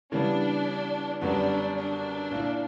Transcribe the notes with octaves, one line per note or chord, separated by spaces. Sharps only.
C#3 E3 G3 B3 D4
F#2 D3 G3 B3 D4
D4
A#2 A#3 E4